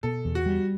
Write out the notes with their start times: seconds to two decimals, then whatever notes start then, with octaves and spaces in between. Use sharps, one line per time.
0.03 B2 A4
0.25 E2
0.35 F#4
0.46 G3